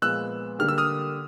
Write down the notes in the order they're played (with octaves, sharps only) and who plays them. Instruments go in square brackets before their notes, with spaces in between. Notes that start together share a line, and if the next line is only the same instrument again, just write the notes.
[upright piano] A#2 F3 G#3 B3 [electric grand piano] E6 F#6
[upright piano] D3 G3 A#3 D4 G4 [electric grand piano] F6
[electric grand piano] E6
D#6 F6